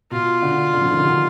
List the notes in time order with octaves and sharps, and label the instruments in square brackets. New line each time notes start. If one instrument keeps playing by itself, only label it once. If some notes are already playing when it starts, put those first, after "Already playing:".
[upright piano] B2 [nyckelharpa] F4
[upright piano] D3
D3
F3
D#3
D3
C3